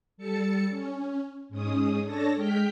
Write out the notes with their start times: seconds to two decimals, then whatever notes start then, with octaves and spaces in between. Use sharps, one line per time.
0.17 G3 A4 A5 C#7
0.70 C#4
1.49 G#2 G#3 C#4 D#6
2.03 D4 A4 C#5 A5 A#6
2.36 G#3 G5 F6 G6 B6